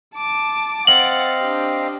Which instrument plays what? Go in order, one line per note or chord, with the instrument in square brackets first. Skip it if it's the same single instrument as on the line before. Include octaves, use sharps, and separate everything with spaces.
[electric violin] A5 D6
[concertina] C4 D#5 F5 [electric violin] F#5 A6 [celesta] F#7
[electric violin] D4 G4